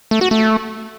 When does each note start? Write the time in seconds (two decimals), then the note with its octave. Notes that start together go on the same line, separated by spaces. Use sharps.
0.11 A3
0.21 F#4
0.31 A3